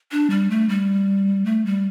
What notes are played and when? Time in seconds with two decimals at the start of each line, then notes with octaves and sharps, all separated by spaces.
0.12 D4
0.30 G3
0.50 A3
0.69 G3
1.46 A3
1.65 G3